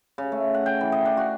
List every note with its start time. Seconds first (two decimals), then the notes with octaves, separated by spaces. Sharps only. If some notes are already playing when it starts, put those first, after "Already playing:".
0.18 C#3
0.32 A3
0.54 F#5
0.66 G5
0.81 E3
0.92 D#5
1.06 D4
1.17 F#4